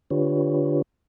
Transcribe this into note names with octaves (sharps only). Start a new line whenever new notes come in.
D3 D4 F4 G4 B4 C#5